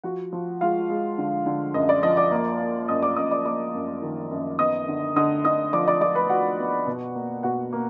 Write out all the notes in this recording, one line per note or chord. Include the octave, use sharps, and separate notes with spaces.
F3 F#4 F#5
F3
G#3 F4 F5
G#3
D3
D3
F#2 D#5
D5
F3 D#5
D5 D6
A#3
A#3
F#2 D#5 D#6
D5 D6
F#2 D#5 D#6
D5 D6
A#3 D5 D6
F#2
D#3
F#2
B3 D#5 D#6
D3
D3 D#5 D#6
D3 D#5 D#6
F3 D5 D6
D5 D6
F3 D5 D6
B4 B5
F3 F#4 F#5
B3
B2
A#3
B2 F#4 F#5
A#3